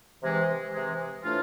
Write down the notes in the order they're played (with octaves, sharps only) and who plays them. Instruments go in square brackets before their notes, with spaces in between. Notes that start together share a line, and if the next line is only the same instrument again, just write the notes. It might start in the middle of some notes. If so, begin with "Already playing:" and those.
[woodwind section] C3 E3 G#3
C3 E3 G#3
A2 E3 A3 D4 F4